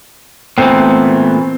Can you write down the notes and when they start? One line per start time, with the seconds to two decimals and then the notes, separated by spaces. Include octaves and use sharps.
0.58 A#2 E3 A3 B3 C4